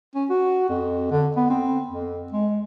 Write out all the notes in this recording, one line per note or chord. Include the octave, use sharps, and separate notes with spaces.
C#4
F#4
F2
D3
B3
C4
F2
G#3